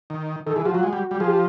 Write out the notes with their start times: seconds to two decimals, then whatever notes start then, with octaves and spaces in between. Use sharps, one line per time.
0.10 D#3
0.46 D#3 A4
0.55 E3 G#4
0.65 F3 F#4
0.74 F#3 F4
0.83 G#3 F#4
0.93 G3
1.11 G3
1.20 F3 G#4
1.27 G4